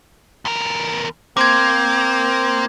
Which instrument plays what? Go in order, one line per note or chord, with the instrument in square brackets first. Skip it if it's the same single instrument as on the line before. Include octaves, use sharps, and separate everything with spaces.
[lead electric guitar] E2 A#4
[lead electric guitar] A#3 [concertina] C4 C5 [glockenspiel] D6 G#6